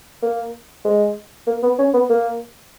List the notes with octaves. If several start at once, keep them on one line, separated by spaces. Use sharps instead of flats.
A#3
G#3
A#3
B3
C#4
B3
A#3